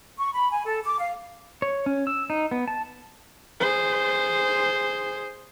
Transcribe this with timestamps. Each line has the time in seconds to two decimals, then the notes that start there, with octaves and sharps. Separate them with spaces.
0.18 C#6
0.33 B5
0.52 G#5
0.66 A4
0.84 D6
0.99 F5
1.62 C#5
1.86 C#4
2.07 E6
2.30 D#4
2.51 B3
2.68 A5
3.60 G#4 C5